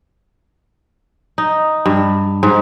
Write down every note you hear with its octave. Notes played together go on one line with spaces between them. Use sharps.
D#4
G2
G#2